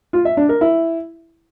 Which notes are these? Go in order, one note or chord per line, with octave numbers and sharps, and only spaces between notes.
F4
E5
D4
A#4
E4